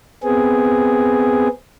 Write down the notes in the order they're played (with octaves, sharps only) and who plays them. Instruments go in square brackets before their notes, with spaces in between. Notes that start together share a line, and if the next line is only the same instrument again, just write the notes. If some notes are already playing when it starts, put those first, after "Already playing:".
[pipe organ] B3 C4 G#4